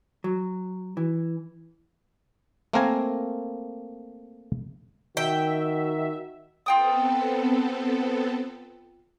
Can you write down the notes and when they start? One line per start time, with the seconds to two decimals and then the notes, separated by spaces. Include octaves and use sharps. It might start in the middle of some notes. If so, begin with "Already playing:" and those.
0.24 F#3
0.97 E3
2.73 A3 A#3 C4 A#4 F5 G#5
5.17 D#3 F#4 E5 G5
6.66 B3 C4 F4 A4 G5 D#6